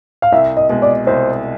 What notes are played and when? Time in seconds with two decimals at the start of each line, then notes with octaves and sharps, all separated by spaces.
0.22 F5
0.32 C2 E5
0.57 D#5
0.69 B2 G#3
0.82 D5
1.07 C2 C5